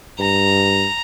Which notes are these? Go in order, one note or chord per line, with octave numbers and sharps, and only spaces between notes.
G2 A#5